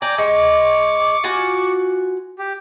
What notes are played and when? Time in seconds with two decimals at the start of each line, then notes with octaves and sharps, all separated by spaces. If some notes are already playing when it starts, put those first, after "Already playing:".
0.02 D5 G5 G#5 A#5 D6
0.18 G#3 C#6
1.24 F4 F#4 G#5
2.39 G4